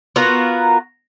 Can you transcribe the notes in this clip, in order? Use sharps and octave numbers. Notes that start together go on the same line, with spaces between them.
B3 F4 F#4 A#4